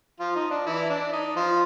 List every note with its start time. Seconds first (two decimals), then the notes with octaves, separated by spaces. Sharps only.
0.20 F3 F4
0.35 D#4
0.51 D4
0.66 E3 E4
0.90 D4
1.13 D#4
1.36 F3 F4